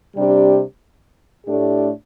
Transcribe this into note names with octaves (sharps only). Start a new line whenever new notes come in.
C3 G3 D4 G4
A2 A3 D4 G4